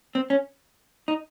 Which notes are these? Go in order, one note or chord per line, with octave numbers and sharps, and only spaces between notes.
C4
C#4
D#4